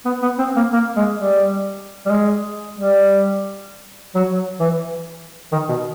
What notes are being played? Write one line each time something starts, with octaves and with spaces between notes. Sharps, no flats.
B3
B3
C4
A#3
A#3
G#3
G3
G3
G#3
G3
F#3
E3
D#3
B2